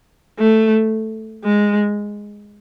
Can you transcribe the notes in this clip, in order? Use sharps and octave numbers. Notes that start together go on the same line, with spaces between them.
A3
G#3